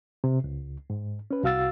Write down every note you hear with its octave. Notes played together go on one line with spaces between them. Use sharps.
C3
C#2
G#2
C#4 B4
C2 F#4 F5 E6 A6